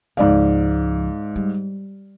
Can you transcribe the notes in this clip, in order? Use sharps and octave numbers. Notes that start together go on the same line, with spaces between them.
C#2 G#2 F3 D5 F5
G3